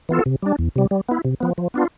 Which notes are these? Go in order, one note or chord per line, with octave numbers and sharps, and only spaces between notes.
E3 B3 F4 A4
C3
G3 D4
E2
C3 G3
G3
B3 E4
C3
F3 B3
F3
B3 D4 F4